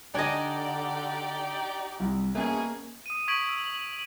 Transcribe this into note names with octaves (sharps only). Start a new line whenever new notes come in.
D3 D4 D#4 G4 D5 D#5 G#5 G#6
C2
B2 A3 A#3 C#4 G#4
D#6 D#7
C#6 D#6 G#6 B6 D7 F#7
E6